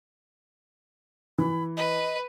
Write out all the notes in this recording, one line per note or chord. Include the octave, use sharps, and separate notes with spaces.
E3 B5
B4 D#5